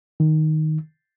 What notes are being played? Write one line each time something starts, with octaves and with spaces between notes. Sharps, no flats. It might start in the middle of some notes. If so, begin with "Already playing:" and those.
D#3